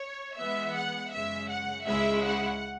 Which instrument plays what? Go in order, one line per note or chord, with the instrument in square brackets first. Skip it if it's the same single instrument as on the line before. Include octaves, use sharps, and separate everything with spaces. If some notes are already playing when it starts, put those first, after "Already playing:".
Already playing: [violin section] C#5
[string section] E3 G#3 B3 [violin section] E5
[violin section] F#5
[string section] F#2 C#3 G#3 [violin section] E5
[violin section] F#5
[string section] C#2 C#3 G#3 E4 [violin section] E5
[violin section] F#5